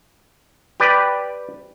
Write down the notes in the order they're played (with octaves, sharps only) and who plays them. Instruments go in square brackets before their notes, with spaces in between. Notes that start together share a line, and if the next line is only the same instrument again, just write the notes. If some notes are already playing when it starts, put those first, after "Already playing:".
[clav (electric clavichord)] G4 B4 D5